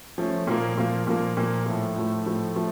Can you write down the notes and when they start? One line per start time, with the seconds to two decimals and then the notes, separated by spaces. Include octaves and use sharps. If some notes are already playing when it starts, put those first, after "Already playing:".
0.18 F3 A3 C#4
0.47 A#2 F3 A#3
0.77 A#2 F3 A#3
1.07 A#2 F3 A#3
1.37 A#2 F3 A#3
1.66 A2 F3 A3
1.96 A2 F3 A3
2.26 A2 F3 A3
2.56 F3 A3